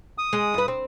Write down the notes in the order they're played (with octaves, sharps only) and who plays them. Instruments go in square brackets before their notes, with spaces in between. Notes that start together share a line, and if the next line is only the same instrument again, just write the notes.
[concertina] D#6
[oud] G#3
G2 B4
C4